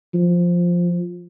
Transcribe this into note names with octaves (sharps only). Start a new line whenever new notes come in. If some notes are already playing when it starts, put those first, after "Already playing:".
F3